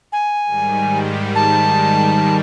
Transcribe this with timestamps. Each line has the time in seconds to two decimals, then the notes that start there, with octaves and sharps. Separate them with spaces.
0.12 G#5
0.45 G#2 D#3 G3
1.35 A5